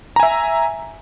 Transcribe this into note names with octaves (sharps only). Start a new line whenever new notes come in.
E5 G#5 A#5